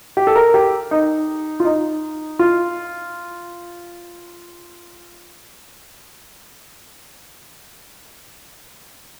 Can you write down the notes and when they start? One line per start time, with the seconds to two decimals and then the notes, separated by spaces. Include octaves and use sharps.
0.17 G4
0.27 A4
0.36 A#4
0.54 G4
0.91 D#4
1.60 F4
1.65 D#4
2.39 F4